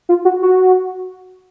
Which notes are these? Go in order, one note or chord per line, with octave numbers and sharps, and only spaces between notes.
F4
F#4
F#4